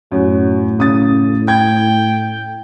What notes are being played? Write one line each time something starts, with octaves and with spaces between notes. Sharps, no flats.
F#2 A2 F#4
C#3 D#6 A6
G5 G#6